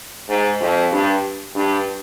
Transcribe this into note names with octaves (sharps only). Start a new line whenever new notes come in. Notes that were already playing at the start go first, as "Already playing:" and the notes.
G#2
F2
G2
G2